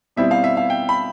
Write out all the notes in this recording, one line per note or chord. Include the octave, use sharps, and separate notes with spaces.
B2 G3 C4 E4 E5
F5
E5
F5
G5
B5